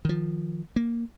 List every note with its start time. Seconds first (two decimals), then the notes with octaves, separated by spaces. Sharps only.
0.05 D#3 F3
0.76 A#3